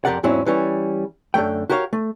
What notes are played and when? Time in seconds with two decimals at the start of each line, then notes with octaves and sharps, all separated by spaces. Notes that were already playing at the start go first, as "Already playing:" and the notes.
0.05 F2 C#3 G4 A#4 D5 F#5
0.23 E2 G#2 F#3 C4 C#4 E4
0.46 E3 G3 C#4
1.34 F#2 D3 F#3 A3 G5
1.69 F#4 G4 A#4 C#5 D#5 F5
1.93 A3